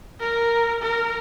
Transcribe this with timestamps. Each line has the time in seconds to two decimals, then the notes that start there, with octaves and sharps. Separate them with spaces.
0.20 A#4
0.82 A#4